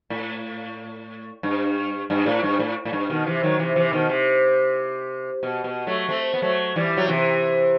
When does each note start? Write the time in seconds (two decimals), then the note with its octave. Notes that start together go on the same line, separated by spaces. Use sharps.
0.10 A2
1.43 G2
2.10 G2
2.26 A2
2.43 G2
2.59 A2
2.85 A2
2.93 G2
3.10 B2 D#3
3.26 C3 E3
3.43 D#3 F#3
3.59 C3 E3
3.76 C3 E3
3.92 B2 D#3
4.09 C3
5.43 B2
5.64 B2
5.87 F#3 A3
6.09 A3 C4
6.34 B3
6.42 F#3 A3
6.76 E3 G3
6.97 F#3
7.08 C3 E3